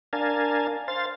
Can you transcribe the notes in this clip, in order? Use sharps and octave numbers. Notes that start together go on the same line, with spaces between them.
D4 A#4 F5 G#5 A5
C5 F5 A6